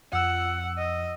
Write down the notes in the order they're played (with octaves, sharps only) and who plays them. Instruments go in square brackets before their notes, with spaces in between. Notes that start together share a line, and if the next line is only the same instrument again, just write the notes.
[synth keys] F2 E6 [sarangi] F#5
[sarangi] D#5